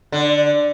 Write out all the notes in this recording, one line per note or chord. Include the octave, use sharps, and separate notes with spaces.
D3